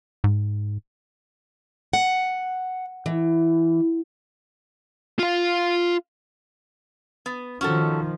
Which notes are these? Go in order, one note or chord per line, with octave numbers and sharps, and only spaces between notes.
G#2
F#5
E3
F4 F5
B3
D#3 F3 C#4 F#4 A4